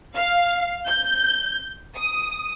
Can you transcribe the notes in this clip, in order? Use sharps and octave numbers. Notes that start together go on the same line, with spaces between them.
F5
G6
D#6